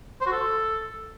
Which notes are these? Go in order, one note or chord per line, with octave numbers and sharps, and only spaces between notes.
C5
F#4
A4